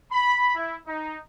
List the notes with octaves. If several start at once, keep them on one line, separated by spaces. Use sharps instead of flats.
B5
E4
D#4